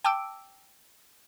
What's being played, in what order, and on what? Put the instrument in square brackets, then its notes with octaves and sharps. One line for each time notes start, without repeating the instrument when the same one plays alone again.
[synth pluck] G5 A5 D6 E6 D7